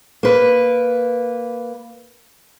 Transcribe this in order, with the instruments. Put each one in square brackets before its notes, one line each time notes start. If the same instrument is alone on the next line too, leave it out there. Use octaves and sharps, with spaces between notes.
[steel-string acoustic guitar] A#3 B4